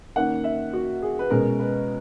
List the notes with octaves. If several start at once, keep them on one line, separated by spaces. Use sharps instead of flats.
D#3 A#3 C#4 F#5
E5
F#4
G#4
B4
B2 G#3 C#4 A#4
B4